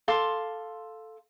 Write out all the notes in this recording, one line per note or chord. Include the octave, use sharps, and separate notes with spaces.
A4 F5 C6 D6